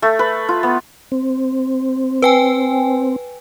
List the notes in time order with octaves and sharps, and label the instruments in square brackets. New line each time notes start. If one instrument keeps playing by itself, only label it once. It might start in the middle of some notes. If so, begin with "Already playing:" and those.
[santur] A3
B4
F4
B3
[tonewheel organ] C4
[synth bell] B4 G5 G#5